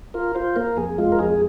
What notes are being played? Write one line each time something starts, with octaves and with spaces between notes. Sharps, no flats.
F4 A#4
F4 C5
A#3 A#4
F2 G#4
G#3 F4
A#4
F2 G#4